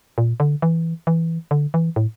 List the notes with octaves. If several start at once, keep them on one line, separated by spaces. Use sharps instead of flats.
A#2
D3
E3
E3
D3
E3
A2